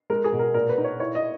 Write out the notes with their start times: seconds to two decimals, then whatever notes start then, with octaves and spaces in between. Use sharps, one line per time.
0.10 G#3 A#4
0.24 G#4
0.32 B2
0.39 A#4
0.54 A#2 A#4
0.69 B4
0.78 D#4
0.84 C#5
1.00 E4 C#5
1.15 D#5